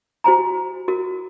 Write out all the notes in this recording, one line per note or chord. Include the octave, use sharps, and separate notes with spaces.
F#4 C5 G#5 A#5
F#4 A#4